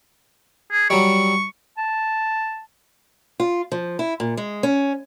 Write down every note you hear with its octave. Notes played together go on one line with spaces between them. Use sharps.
G#4
F#3 G3 C#6
A5
F4
F3
E4
A#2
G#3
C#4